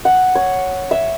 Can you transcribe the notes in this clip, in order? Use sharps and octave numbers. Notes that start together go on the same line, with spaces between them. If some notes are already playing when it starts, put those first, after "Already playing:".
F#5
C#5
E5